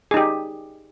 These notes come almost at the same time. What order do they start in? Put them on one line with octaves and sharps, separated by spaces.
G#4 D#4 G4